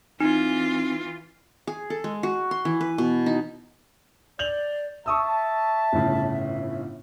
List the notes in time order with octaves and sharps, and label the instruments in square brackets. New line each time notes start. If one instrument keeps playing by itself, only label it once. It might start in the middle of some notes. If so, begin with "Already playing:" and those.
[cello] E3 F4 [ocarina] C4 [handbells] D#4
[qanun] G#4
A4
G#3
F#4
C6
E3
B4
B2
D#4
[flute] D5 [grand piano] G6 F7 F#7
[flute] E5 [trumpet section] A5 [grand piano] C#6 D#6 E6
[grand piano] G1 A2 C#3